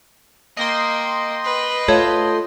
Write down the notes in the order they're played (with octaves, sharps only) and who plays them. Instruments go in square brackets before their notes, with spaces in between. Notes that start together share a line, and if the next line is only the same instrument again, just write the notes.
[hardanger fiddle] A#3 [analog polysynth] D#5 G5 C6
[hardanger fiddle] B4
[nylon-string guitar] A3 F4 A4 [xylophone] C#5